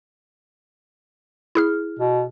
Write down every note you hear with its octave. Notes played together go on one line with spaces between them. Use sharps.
E4 G#4 F6
B2